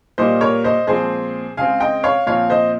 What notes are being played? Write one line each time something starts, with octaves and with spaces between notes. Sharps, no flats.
A#2 G3 A#3 C5 D#5
A#4 C#5
C5 D#5
A#2 F3 G#3 C4 G#4 C5
C#3 G#3 C4 F5 G#5
D#5 G5
C#5 F5
A#2 F3 C4 C#5 F5
C5 D#5